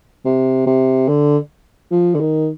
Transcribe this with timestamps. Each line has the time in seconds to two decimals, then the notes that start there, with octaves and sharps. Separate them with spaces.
0.25 C3
0.66 C3
1.08 D3
1.91 F3
2.15 D3
2.20 D#3